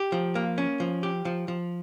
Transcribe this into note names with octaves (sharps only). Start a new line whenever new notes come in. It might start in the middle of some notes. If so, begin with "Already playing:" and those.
Already playing: G4
F3
A#3
C#4
F3
G4
F3
F3